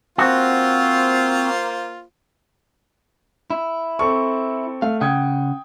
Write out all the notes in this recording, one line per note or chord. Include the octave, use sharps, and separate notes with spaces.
A#3 C4 F4 F#4 C5
E4
C4 A4 C#6
A3 F5
C#3 F#5 G5 D#6 G#6